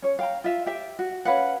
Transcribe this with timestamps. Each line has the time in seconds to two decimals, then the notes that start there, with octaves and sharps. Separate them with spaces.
0.02 C#4 C#5
0.19 F5 G5 A#5
0.44 F4 E5 F5
0.66 G4 E5 G5
0.99 F#4
1.25 C#4 B4 F5 F#5